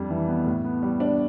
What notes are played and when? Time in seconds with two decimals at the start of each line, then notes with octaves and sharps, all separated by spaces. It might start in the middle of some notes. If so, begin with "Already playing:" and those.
Already playing: F2 G3 D4
0.10 E3
0.28 B3
0.46 A2
0.64 B3
0.83 G3
1.00 D4